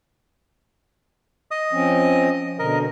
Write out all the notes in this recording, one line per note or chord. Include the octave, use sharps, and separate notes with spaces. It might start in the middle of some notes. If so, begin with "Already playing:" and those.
D#5 D#6
F3 C4 C#4
B2 D3 A#4 D#5